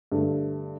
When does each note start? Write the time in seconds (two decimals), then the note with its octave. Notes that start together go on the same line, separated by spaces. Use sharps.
0.12 G2 D3 A3